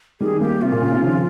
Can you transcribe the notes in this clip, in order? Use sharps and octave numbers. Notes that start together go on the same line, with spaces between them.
D#3 G3 G#4
G3 A#3 G4
C3 F4
A#2
A#2 C#3
C3 D#3
C#3 F3